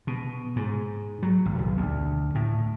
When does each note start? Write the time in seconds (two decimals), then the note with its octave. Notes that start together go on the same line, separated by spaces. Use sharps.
0.07 B2
0.56 G#2
1.23 F#3
1.46 G#1
1.59 B1
1.77 D2
2.35 A2